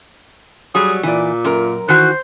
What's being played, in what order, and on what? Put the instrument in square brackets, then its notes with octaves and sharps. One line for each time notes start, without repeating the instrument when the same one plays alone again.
[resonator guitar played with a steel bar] F#3 G3 [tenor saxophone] G#4
[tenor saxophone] A#2 [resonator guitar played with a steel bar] E3 D5
[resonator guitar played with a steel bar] F#2 A#4
[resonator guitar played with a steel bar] D#3 E3 F#4 [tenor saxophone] C5 [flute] F#6